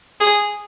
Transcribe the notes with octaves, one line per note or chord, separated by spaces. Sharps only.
G#4